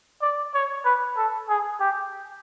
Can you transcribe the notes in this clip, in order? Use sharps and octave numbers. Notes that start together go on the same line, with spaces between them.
D5
C#5
B4
A4
G#4
G4